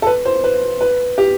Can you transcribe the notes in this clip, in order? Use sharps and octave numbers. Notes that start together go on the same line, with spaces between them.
A4
B4
C5
B4
B4
G4